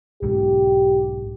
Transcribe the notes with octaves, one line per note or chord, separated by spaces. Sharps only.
B1 G#2 G4